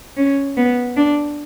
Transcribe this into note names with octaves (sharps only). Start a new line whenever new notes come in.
C#4
B3
D4